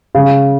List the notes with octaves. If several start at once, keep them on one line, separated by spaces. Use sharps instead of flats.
C#3